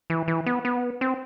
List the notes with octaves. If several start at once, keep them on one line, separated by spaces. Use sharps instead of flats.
E3
E3
B3
B3
C4